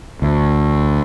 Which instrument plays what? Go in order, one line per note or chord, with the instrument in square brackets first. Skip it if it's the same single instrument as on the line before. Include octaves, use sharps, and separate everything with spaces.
[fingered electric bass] D2